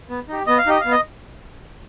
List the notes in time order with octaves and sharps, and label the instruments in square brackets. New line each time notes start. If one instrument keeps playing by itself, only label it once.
[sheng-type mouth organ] B3
D#4 G4
B3 D#5
F5
D#4 G4 D#5
B3 F5
D#5